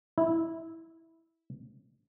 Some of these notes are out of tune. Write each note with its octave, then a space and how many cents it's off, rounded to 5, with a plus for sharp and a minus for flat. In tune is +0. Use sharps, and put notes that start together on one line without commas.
E4 -10